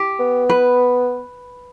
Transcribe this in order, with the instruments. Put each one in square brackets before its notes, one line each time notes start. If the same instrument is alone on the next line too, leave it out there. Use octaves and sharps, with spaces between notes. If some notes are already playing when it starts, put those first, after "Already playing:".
Already playing: [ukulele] G4
[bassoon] B3
[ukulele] B4